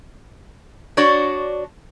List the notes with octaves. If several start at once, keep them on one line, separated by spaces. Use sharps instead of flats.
D4 F#4 C#5 D5